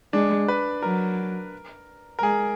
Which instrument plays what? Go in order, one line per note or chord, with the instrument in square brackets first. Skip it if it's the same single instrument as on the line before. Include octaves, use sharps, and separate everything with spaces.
[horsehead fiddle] G#3 [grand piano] D4
[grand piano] B4
[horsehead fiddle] F#3 [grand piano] A#4
[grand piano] A#4
[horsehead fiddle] G#3 [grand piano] G#4